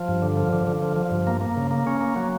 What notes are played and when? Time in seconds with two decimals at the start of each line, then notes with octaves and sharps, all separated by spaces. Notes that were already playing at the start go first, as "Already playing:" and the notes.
Already playing: F3
0.08 G2
0.22 D3
0.37 F3
0.53 D3
0.67 D3
0.82 F3
0.96 F3
1.11 G2
1.27 A#3
1.41 A#3
1.57 C#3
1.71 A#3
1.87 C#4
2.01 A#3
2.16 F#3